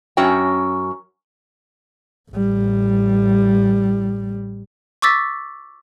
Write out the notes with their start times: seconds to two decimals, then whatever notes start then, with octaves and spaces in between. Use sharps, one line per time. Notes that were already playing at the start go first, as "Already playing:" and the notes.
0.17 F#2 C#4 F#4 C#5 G5
2.32 A1 G3
5.02 C#6 D6 E6 A6 B6